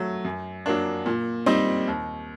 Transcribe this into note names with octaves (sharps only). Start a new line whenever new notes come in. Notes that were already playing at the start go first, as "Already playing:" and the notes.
Already playing: F#3 A3
F#2
F#3 A#3 D4
A#2
G3 C4 D#4
D#2